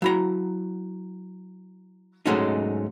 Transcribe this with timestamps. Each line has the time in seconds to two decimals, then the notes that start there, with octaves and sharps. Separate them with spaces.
0.02 F#3 E4 A#5
2.26 G#2 F#3 G#3 A3 C#4 D#4